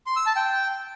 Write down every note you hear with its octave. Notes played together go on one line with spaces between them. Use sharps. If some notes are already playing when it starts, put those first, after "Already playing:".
C6
E6
A5
G5